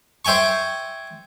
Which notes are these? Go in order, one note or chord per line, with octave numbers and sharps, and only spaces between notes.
C5 E5 G5 G#5 C#6